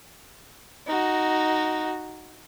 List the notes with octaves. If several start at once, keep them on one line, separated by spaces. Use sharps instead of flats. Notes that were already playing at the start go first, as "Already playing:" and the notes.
D#4 F#4